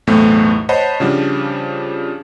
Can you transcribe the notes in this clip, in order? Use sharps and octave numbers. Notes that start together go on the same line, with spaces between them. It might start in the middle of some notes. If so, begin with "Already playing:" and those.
B1 E2 A2 A3 C4
C5 C#5 D#5 F#5 A5 B5
C#3 F3 G3 D4